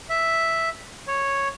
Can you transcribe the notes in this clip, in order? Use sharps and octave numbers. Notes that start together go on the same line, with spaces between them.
E5
C#5